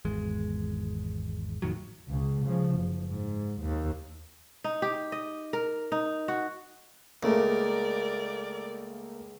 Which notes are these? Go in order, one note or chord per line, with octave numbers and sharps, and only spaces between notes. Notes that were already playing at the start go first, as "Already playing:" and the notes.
G#1 E2 G#3
F2 A2 D#3 F#3
C#2 C#3
C#3 F3
F#1
G#2
D#2
D#4
G4
D#5
A#4
D#4
F#4
C#2 A3 A#3 A#4 D5